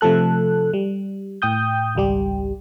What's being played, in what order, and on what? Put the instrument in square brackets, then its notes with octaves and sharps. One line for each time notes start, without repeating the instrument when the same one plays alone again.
[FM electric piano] C3 F3 A3 A4 F#6
G3
A2 G5 D#6 G6
G#1 C#2 G3 G4